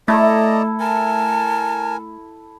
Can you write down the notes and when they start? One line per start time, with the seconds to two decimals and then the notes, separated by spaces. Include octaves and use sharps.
0.08 A3 E4 A4 D5 D#5 A5 A#5
0.80 A#4 G#5 A5